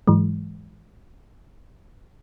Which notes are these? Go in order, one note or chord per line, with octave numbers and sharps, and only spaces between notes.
G#2 E3 F#3 G#3